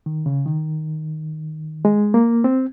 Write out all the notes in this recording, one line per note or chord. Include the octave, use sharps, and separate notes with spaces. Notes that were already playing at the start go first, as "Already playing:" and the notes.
D#3
C#3
D#3
G#3
A#3
C4